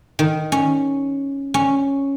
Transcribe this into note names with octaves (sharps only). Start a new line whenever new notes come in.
D#3
C#4
C#4